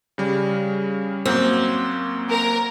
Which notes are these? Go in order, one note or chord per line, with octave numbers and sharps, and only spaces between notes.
C#3 G3
F#2 A#3 C4 F#4
A#4